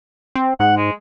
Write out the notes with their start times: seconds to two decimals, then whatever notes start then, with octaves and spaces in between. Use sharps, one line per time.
0.35 C4
0.60 G#2 F#5
0.77 G#3